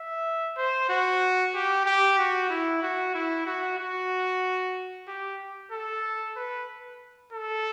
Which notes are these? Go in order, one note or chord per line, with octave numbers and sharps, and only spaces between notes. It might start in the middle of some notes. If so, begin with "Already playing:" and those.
Already playing: E5
C5
F#4
G4
G4
F#4
E4
F#4
E4
F#4
F#4
G4
A4
B4
A4